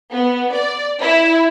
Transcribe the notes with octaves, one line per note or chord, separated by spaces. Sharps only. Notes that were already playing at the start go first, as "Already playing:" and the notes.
B3
D5
E4